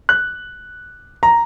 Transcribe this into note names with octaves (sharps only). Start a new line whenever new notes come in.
F#6
A#5